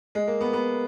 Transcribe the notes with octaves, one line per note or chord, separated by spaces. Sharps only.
G#3
A#3
B3
B3